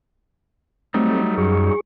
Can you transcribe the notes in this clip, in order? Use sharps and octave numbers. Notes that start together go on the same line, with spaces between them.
F#3 G3 A3 C4 D#4
F#2 G#4 C#6